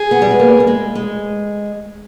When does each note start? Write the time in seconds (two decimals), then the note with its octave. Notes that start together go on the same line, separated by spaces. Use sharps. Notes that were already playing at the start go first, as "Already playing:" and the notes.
Already playing: G#4
0.11 B3
0.22 G3
0.31 G#3
0.40 A#3
0.60 G3
0.67 G#3
0.95 G#3